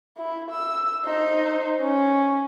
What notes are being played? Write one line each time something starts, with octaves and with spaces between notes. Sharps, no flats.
E4
E6
D#4 C5
C#4